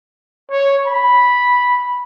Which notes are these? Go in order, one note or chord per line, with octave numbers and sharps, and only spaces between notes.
C#5
B5